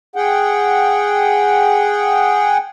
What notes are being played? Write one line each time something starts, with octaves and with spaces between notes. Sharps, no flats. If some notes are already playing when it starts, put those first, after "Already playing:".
G#4 F#5 G5